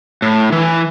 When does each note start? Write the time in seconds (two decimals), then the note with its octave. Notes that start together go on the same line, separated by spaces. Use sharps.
0.22 A2
0.52 E3